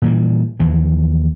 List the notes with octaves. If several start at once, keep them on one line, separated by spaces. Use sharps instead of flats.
A#2 E3 G3
D#2 E3 F3